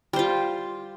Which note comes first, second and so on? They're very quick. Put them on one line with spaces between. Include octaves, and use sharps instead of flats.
G3 C5 F4